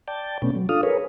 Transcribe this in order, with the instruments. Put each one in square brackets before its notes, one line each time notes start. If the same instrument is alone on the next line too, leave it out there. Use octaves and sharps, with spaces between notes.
[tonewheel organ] D5 G5 A5
B2 A3 B3 C#4
F#3
D4 F4 A4 F5 D#6
G#4 A#4 B4 C#5